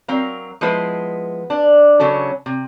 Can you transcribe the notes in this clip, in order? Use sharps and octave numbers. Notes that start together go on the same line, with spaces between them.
F#3 C4 A#4 F5
F3 G#3 B3 E4 B4 C5
D4
C#3 F#3 C#4 A4
C3